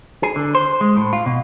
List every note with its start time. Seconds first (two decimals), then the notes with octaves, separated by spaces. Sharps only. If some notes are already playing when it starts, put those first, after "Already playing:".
0.23 G#4
0.36 D3
0.55 C5
0.81 G#3
0.96 A2
1.13 F4
1.26 B2